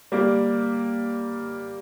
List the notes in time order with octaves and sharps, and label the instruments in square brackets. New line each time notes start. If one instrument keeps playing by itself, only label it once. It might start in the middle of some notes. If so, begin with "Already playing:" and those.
[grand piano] G3 A#3